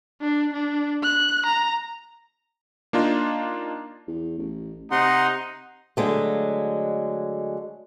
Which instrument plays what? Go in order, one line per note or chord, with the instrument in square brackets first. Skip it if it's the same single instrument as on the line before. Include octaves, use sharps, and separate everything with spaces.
[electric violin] D4
D4
F#6
A#5
[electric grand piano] A#3 D4 D#4 F4
[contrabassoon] E2
A1
[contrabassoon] C3 [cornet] D#4 [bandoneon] F#5 C6
[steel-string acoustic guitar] D3 F#3 G#3 A3